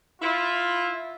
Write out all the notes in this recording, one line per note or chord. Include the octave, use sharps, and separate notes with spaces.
E4 F4